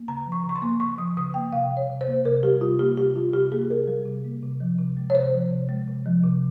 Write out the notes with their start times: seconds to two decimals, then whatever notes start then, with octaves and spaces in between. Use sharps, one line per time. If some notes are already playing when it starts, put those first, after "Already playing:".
Already playing: A#3
0.08 C#3 A#5
0.26 F3
0.32 C#6
0.44 C#3
0.49 C#6
0.56 C6
0.62 A#3
0.80 C#3 C#6
0.98 F3 D#6
1.17 C#3 D#6
1.34 A#3 G5
1.53 C3 F5
1.71 G3
1.77 C#5
1.89 C3
2.01 C5
2.07 A#3
2.25 C3 A#4
2.43 G3 G4
2.61 C3 F4
2.79 A#3 G4
2.97 C3 G4
3.16 G3 F4
3.33 C3 G4
3.52 A#3 G#4
3.70 C3 A#4
3.87 G3
4.06 C3
4.24 A#3
4.43 C3
4.60 F3
4.79 C3
4.97 G#3
5.10 C#5
5.15 C3 C5
5.33 F3
5.51 C3
5.69 G#3
5.87 C3
6.06 F3
6.24 C3